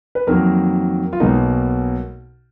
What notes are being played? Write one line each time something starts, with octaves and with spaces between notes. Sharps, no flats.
B4
F2 D#3 F#3 A#3 A#4
F4
B1 B2 A#3 D#4